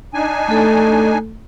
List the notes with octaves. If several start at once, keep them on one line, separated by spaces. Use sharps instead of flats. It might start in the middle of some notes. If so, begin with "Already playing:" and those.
D4 D#4 G#5
A3 A4